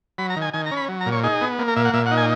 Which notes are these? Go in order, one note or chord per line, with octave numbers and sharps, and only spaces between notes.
F#3 B5
A#5
D#3
G#5
D#3 G#5
A#5
C#4
B5
F#3
A#5
A#2
C#5
D#4 G#4
B3
A#3
A#4
A#2 E5
F#5
A#2 E5
F#5
D#4
G#5